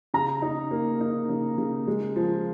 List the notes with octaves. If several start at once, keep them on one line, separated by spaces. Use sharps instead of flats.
C#3 A#5
D#4
A#3
D#4
C#3
C#3
G#3
F3